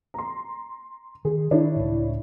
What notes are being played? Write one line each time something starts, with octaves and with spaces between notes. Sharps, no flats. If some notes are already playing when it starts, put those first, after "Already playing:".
A#5 C6
D#3 G#4
D#3 D4 E4 C#5
C#2 A2